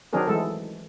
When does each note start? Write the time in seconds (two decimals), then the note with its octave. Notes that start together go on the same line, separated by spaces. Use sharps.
0.13 D#3 F#3 C4 D4 G#4 A#4
0.27 E3 G#3 A3 A4